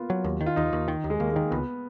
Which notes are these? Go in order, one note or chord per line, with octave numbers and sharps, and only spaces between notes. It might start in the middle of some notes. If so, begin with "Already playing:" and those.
Already playing: A#3 B3 F4
F#3
D#2
D#3
F4
D#2 D#4
D#2
D#3
D#2
G#3
D#2 A#3
G#3
D#3
C#2 B3